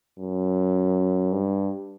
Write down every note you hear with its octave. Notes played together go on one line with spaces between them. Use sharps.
F#2
G2